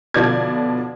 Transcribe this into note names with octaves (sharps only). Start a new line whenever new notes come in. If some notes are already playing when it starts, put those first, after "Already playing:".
B1 D3 F3 B3 D5 G#6